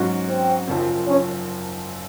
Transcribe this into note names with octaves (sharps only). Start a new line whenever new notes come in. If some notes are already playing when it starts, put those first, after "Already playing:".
Already playing: G#2 F#3 C#4 F#4
C4
F#1 F#2 F3 C4
C#4